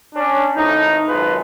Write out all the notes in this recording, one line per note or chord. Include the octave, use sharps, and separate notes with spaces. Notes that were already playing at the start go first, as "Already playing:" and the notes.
C#4 D4
G#1 A2 D#4
G#1 F#2 G#3 F4 B4